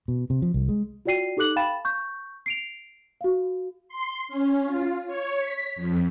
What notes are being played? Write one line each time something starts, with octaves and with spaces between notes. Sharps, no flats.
B2
C3
F3
C2
G#3
F4 F#4 D5 G5 C7 D#7
D#4 G4 A4 D6 F#6 F#7
F5 G5 A5 B5 A6 E7
C#6 G6
C7 D7 F7
F#4 F5
C6
C#4
F4
C#5
B6
F2